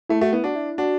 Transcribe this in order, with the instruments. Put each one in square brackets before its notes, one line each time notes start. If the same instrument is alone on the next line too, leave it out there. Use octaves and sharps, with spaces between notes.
[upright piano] A3 [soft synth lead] E4
[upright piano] A3 [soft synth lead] F#4
[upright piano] B3 [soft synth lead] E4
[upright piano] D4 [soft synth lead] F#4
[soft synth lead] E4
[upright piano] D4 [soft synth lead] F#4